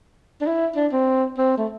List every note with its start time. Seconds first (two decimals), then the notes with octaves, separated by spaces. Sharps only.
0.41 D4
0.47 E4
0.76 D4
0.92 C4
1.38 C4
1.57 A3